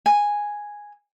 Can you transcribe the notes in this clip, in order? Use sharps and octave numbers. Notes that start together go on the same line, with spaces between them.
G#5